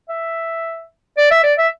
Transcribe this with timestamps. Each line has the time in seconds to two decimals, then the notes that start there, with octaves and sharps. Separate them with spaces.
0.09 E5
1.17 D5
1.31 E5
1.44 D5
1.58 E5